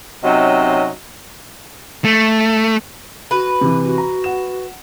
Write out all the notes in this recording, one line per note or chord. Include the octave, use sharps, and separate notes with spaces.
C3 F#3 C#4 D#4 D#5
A3
F#4 B4
C3 E3
F#4
A#5
F#5 E7